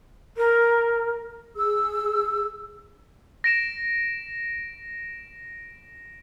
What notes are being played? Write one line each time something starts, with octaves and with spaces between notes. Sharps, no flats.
A#4
G#4 E6
A#6 D7 E7